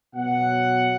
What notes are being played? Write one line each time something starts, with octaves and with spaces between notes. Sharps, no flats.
B2 F#3 F#5